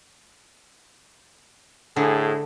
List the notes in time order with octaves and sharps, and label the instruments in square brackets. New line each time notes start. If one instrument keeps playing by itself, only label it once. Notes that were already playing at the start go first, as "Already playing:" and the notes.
[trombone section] A2 G#4 [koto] D3